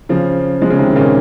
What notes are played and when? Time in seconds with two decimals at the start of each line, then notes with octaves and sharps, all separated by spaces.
0.09 C#3 F3
0.61 F3 G#3
0.70 C#3
0.79 C3 D#3
0.91 D#3
0.96 A#2 C#3